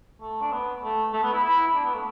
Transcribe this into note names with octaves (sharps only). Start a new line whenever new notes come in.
A3
D4
B3
A3
A3
B3
E4
E4
E4
D4
B3
A3